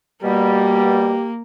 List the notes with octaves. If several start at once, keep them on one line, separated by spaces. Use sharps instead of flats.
B2 G3 A#3 G4